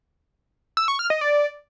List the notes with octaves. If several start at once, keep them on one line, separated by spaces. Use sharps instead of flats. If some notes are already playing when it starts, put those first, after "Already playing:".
E6
C#6
F6
D#5
D5